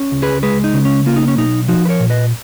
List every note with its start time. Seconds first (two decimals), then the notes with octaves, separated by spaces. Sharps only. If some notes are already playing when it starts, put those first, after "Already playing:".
Already playing: C#4
0.12 C#2
0.22 G#4 B4
0.43 G#3 G#4 B4
0.64 D#4
0.74 C#3
0.85 C#4
1.06 A#3 F4
1.16 D#4
1.28 C#4
1.37 B1 D#4
1.68 F3 D#4 F#4
1.85 B4
1.89 A#4 C#5
2.00 A#2
2.10 B4 D#5